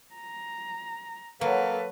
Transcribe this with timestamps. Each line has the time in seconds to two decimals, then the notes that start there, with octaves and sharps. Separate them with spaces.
0.15 A#5
1.41 F#3 A#3 A4 B4